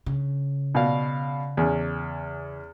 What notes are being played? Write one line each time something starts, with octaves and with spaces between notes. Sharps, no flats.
C#3
B2 D5 F5
E2 C#4